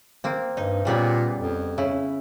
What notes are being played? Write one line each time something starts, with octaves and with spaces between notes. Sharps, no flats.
A#3 C4
G2 D#4
A#2 C#3 G3 B3
F2
C#3 E4